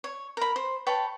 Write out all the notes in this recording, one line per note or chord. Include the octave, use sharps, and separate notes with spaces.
C#5
A#4 B5
C5
B4 C#5 G5 A5